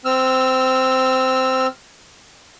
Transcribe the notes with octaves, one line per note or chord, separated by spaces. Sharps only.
C4 E6 F6